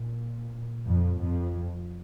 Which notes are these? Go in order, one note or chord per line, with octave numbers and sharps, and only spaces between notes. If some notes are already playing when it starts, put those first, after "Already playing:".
Already playing: A#2
F2
F2